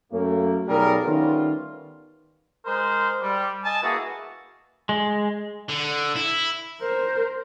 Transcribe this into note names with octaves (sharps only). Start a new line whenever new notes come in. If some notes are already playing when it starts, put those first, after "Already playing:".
F#2 A3 A#3
B1 G3 G#4 A#4
D#3 G3 A3 B3 C#4 F4
G#3 A#4 C5
G3
D#5 G#5 A5
A#3 E4 F#4 G#4 B4
G#3
D3
E4
A#4 C5